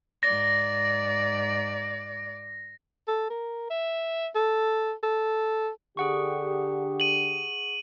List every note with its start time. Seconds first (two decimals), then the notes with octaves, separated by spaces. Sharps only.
0.23 G#2 D5 A#6
3.08 A4
3.30 A#4
3.70 E5
4.35 A4
5.03 A4
5.97 D3 G4 G#4 F#5 C#6
7.00 D#7 F#7